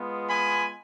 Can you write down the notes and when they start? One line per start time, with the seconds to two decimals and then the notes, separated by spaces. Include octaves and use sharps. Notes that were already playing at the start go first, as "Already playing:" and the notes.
Already playing: G#3 B3 F4
0.29 G#5 B5